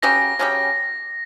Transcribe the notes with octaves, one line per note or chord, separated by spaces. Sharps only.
C#3 F#3 C#4 G4 A#6
C#3 F#3 C#4 G4